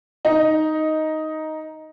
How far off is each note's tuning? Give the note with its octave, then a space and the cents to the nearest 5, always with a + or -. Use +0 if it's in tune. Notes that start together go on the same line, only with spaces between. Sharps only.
D#4 +5